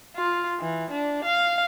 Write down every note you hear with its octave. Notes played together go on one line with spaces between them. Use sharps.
F4
E3
D4
F5